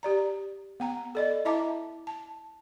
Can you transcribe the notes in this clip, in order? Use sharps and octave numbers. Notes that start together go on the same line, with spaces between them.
G4 D5 A#5
B3 G5 A#5
A4 D5 D#5
E4 D#5 E5 A5 A#5 D6
A5